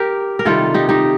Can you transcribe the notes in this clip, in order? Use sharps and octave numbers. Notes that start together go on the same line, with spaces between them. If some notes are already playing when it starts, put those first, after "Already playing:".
Already playing: G4 A#4
A#4
C3 D#3 G3 F4 A4
D#4 G4
D#4 G4